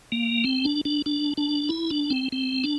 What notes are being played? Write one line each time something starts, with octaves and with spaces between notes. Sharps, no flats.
A#3
C4
D4
D4
D4
D4
E4
D4
C4
C4
D4